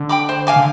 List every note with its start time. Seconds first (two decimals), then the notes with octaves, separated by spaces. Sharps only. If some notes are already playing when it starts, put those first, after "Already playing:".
Already playing: D3
0.09 G5 B5 D6
0.29 C5
0.47 F5 G#5 D6
0.56 D3